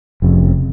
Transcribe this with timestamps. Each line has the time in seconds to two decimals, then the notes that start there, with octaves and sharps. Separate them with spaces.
0.22 F1 F2 C#3